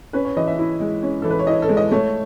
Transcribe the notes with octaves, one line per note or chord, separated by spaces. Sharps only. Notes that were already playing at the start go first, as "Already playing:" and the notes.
C#4 B4
C#5
E3 D#5
E5
E4
G#3
C#4
E3 A4
B4
C#5
E4 D#5
A4
G#3
D#5
A3 C#5